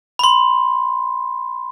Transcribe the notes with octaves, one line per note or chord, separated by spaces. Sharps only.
B5 C6